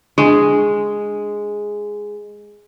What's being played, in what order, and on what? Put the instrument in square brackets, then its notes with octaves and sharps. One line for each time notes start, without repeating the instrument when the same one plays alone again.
[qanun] G#3 [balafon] D4 G#5